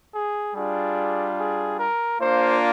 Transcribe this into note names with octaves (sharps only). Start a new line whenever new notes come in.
G#4
G3 D4 F4 G#4
G#4
A#4
A#3 D4 F4 C5